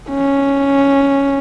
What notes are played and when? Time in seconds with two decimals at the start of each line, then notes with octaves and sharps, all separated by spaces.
0.10 C#4